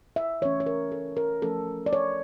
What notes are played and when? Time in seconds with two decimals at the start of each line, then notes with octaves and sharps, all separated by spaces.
0.16 E5
0.41 E3 A3 C#4 C#5
0.60 C#5
0.66 A#4
0.92 A4
1.17 A#4
1.42 F3 A3 C#4 A4
1.86 D5
1.93 C#5